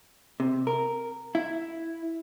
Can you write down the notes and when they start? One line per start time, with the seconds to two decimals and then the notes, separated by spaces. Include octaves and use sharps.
0.40 C3
0.67 A#4
1.35 E4